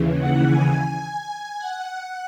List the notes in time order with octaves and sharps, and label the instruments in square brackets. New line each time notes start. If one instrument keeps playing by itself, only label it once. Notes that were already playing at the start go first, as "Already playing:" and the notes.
Already playing: [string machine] D#2 C#3 E3
F#5
G#5
F#5